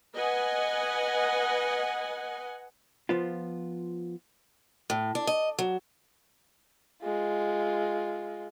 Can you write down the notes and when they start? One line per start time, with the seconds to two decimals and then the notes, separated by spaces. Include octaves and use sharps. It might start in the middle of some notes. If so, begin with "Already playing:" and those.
0.14 B4 D#5 F#5 G#5
3.09 F3 B3 F4
4.90 A2
5.15 D4
5.27 D#5
5.59 F#3
7.02 G#3 F4